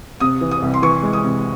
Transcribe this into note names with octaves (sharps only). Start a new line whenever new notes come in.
C3 D#6
E3
D#6
C2
C6
E3 C#6
G#3
D#6
C3